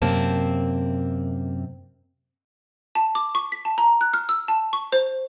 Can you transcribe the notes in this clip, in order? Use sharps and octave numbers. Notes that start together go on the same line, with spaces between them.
F#2 C3 A#3 C4 A5
A5
D6
C#6
B6
A5
A#5
F#6
F6
E6
A5
C#6
C5